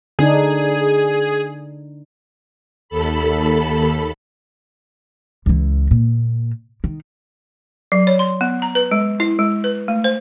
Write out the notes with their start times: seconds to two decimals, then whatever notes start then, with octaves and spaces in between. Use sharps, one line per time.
0.19 D3 D4 D#4 G#4
2.89 D#2 A4 B5
5.46 C#2 E3
5.91 A#2
6.84 D#3
7.92 F#3
8.07 C#5
8.19 C6
8.41 B3
8.62 A#5
8.75 B4
8.91 G#3
9.20 E4
9.39 G#3
9.64 B4
9.88 A3
10.04 C5